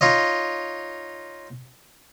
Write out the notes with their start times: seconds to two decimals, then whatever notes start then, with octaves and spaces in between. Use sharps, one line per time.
0.01 D#4 F4 C#5 D#5